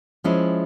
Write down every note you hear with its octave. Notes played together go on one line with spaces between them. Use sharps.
F3 G#3 C#4 E4